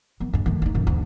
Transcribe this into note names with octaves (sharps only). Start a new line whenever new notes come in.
D#3 B3
G2 G#3
D#3 A3
D#4 E4
F#2 D#3
D2